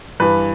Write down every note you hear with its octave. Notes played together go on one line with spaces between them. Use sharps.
G2 E3 B4